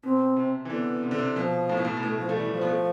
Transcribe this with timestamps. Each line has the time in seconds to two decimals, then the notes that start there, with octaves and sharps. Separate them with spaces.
0.03 B2 C4
0.36 C3
0.65 E3
0.70 D3 B3
1.03 C3
1.11 D3
1.19 C3
1.36 B2 F3
1.69 A2
1.77 B2
1.85 A2
1.97 A2
2.03 B2 A3
2.19 F3
2.29 A3
2.36 E3 G3
2.53 F3
2.61 B3
2.69 A3